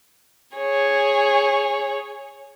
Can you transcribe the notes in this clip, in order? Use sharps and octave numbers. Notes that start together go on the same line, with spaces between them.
G#4 C#5